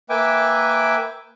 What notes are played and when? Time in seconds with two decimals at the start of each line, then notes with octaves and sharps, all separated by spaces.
0.10 A#3 B4 E5 G5 G#5 D6